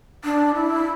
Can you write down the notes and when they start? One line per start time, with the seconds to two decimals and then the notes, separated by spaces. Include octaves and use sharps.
0.24 D4
0.55 E4